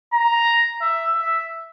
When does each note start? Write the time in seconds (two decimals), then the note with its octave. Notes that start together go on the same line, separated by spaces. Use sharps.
0.14 A#5
0.82 E5
1.15 E5